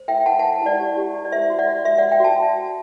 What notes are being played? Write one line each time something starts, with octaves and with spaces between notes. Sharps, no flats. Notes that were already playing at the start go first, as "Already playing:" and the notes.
Already playing: C5
E4 E5 G5
E4 F#5 A5
F#5 A5
C5
E4 D5 F#5
G4
G4
E4
D5
C5 E5
F#4
D5 F#5
F#4
F#4 E5
D5 F#5
C5
E5 G5
F#4 A5